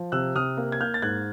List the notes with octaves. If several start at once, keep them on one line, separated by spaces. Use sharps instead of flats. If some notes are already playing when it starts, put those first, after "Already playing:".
Already playing: F3
C3 E6 F#6
C3 D#6 F6
A#3
G#6
A#3 F6 G6
A6
G#2 F#6 G#6